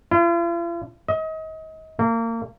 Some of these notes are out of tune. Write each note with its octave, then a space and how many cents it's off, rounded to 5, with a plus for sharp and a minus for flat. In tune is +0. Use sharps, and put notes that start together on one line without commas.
F4 -45
D#5 +30
A#3 -30